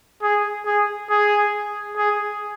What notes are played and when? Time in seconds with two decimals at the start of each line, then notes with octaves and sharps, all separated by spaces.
0.22 G#4
0.66 G#4
1.10 G#4
1.96 G#4